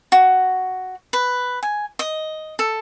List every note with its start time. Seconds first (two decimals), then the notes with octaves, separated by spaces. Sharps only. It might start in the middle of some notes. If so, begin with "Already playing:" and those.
0.12 F#4
1.13 B4
1.63 G#5
1.99 D#5
2.59 A4